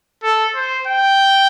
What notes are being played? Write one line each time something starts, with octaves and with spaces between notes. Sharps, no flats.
A4
C5
G5